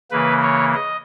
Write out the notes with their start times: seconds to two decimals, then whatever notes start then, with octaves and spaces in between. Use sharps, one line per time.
0.11 C#3 E3 A#3 B4
0.42 C#5
0.74 D#5